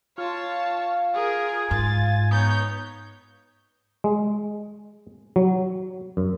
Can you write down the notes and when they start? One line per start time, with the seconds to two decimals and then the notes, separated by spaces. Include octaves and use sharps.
0.18 F4 C#5 F5 A5
1.15 G#4 A#4 G#5
1.71 G#2 F4 A6
2.31 B3 D#4 C#5 G6
4.04 G#3
5.36 F#3
6.17 F#2